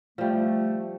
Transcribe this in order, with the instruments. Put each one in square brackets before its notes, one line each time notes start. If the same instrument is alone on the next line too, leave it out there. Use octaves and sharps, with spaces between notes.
[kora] F3 G3 [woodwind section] A3